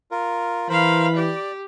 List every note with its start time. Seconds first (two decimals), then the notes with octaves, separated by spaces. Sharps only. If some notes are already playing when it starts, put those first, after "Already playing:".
0.11 F4 A#4
0.69 E3 A#4 C5 F5 B5
1.16 G4 D5